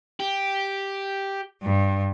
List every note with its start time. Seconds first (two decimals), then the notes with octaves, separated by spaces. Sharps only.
0.20 G4
1.63 G2